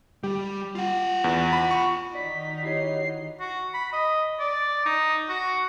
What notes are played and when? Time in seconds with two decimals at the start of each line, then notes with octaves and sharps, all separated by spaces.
0.23 G3 G4
0.75 F4 F#5
1.24 E2
1.53 B5
1.71 C#6
2.15 D#3 D#4 F#4 D5 B6
2.63 E4 G4 C#5 C7
3.40 F#4
3.74 B5
3.93 D#5
4.40 D5
4.86 D#4
5.29 F#4